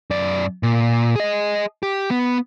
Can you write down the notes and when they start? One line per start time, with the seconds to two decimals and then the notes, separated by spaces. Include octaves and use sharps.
0.11 F#2 D5
0.63 A#2
1.16 G#4 D#5
1.83 G4
2.11 B3